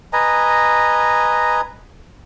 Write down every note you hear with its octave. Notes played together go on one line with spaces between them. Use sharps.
B4 D#5 G#5 A#5